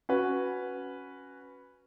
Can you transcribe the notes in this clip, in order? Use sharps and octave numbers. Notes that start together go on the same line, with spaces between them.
C#4 F#4 B4